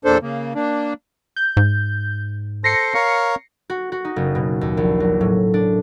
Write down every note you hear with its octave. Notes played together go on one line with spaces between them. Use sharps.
E2 A#2 D4 A4 C5
C#3 A#3
A#3 D4
G6
G#2
A4 C5 A#6 C7 C#7
A#4 C#5 F5
F#4
F#4
D#4
F#1
B2
D#2
A#1
F#3
A2
D4